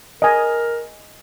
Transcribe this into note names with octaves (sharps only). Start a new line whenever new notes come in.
A#4 D#5 G#5